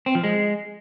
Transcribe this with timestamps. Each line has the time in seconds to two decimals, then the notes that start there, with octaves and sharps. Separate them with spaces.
0.06 C4
0.15 F3
0.24 G#3